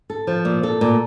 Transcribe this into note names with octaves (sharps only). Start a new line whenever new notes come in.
A4
F3
A#2
A4
A#2